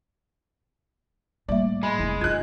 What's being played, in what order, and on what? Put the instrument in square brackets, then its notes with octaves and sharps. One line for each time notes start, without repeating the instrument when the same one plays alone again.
[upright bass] A2 [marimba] G3 A#3 E5 [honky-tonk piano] D5
[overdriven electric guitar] G#3 [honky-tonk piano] B5
[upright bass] F1 E4
[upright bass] F#1 D#4 [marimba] F4 [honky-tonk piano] F#6 G#6